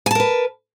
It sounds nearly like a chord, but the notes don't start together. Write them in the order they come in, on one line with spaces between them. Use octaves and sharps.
G#5 A5 A#4 B4